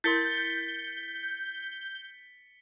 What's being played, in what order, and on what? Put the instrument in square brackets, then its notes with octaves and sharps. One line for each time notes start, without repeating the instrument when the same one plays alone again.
[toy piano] E4 A#4 C6 [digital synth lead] G6 [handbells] A6 [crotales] B6 C#7 G7